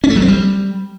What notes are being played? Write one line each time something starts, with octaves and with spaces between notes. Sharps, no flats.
C#4
A3
F#3
C4
G3